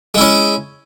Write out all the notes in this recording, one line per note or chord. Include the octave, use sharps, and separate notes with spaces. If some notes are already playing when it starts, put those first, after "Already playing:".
G#3 C#4 E4